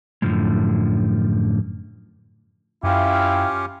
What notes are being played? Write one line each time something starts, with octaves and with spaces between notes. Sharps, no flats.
F#2 A2 D3 D#3 F3 G#3
F#2 C#4 E4 F4 G4 F5 G5